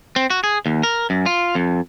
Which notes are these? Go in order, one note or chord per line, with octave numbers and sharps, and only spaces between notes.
C4
F#4
G#4
D#2
A#4
F#2
F4
F2